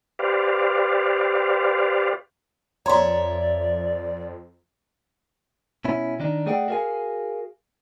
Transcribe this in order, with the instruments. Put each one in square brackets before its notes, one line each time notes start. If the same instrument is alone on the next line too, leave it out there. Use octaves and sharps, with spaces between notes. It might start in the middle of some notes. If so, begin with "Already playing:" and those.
[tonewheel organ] G4 B4 C5 D5 F5
[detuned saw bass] F2 [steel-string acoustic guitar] C#5 E5 [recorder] D5 [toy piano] A#5 C6
[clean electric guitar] B2 C#4 E4
D#3 D4 D#4
A3 G#4 D5 D#5 F#5 G5
F#4 G#4 A#4 D5 F5 G#5